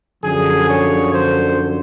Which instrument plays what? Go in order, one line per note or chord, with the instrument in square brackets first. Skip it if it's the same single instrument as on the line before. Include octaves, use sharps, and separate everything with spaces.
[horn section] F#2 D3 F3 G#4
C#5
C5